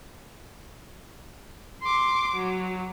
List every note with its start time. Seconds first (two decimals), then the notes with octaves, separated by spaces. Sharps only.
1.82 C6 D6
2.35 F#3